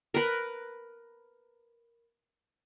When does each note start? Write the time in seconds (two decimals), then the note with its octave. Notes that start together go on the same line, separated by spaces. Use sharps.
0.14 A#4 B4